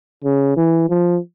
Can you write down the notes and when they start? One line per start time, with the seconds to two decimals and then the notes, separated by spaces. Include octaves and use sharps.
0.24 C#3
0.57 E3
0.89 F3